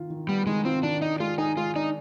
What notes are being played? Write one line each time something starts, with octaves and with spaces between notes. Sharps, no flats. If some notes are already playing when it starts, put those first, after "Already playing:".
Already playing: D#3 F4
D#3
G3 B3
D#3 G#3
C4 F4
D#3 D4
D4 D#4
G#3 F4
D#4 G#4
G#3 F4
D4 D#4